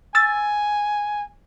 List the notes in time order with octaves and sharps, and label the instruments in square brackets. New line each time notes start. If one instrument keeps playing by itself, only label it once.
[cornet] G#5 [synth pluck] E6 A6